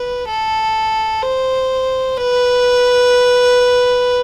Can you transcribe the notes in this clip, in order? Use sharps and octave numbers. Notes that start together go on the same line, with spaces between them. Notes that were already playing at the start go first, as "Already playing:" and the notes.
Already playing: B4
A4
C5
B4